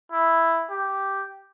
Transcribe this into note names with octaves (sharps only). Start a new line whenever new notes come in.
E4
G4